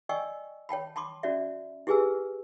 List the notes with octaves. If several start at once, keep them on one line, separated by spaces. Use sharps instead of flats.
D5 D#5 G5 G#5 C#6 E6
C#5 G5 A5 B5
A5 B5 C6 D6
C#4 F#4 D5 E5
E4 G4 G#4 B4 G#5 E6